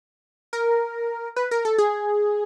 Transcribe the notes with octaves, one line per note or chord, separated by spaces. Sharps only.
A#4
B4
A#4
A4
G#4